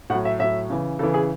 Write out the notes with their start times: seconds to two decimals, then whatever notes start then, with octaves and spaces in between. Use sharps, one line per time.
0.10 A2 F#5
0.14 F#3
0.25 E5
0.40 A2 F#3 E5
0.70 C#3 E3
0.99 C#3 A4
1.03 E3
1.14 G#4